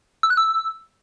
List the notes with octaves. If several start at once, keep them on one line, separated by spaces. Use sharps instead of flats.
E6
F#6
E6